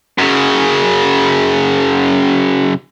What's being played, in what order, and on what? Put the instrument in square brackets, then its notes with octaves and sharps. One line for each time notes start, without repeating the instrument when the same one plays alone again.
[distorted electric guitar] F#2 C#3